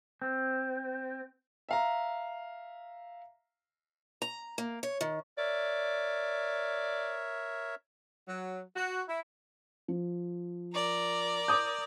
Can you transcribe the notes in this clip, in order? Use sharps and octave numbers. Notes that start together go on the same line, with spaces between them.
C4
E5 F5 A#5
A#5
A#3
C#5
D#3
A#4 C#5 D5 E5
F#3
F#4
E4
F3
A#4 D5
D6 D#6 G6